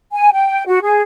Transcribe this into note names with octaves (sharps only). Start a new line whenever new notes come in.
G#5
G5
F#4
G#4